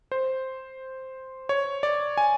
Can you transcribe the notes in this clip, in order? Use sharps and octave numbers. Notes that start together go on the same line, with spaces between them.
C5
C#5
D5
G#5